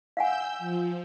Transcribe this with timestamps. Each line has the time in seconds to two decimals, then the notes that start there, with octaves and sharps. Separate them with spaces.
0.17 F5 F#5 G#5 E6 G6
0.59 F3